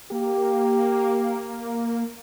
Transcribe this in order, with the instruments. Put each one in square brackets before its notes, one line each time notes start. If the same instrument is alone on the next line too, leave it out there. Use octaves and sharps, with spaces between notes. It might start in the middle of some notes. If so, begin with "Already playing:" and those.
[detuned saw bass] A#3 [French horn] G4